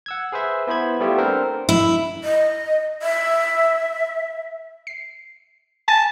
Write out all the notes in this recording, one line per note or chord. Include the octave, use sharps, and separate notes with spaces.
F#5 E6 G#6
G#4 B4 C5 E5
B3 E4 C5 B5 G#6
G3 A3 B3 E4 F4 G4
C4 D4 A4 A#4 C5
E4
D#5
E5
C7
G#5 A5 A6